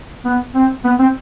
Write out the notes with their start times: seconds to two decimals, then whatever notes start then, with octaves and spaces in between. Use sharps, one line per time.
0.25 B3
0.55 C4
0.84 B3
0.99 C4